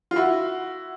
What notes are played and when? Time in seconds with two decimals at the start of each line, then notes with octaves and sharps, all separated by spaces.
0.11 F4
0.16 E4 F#4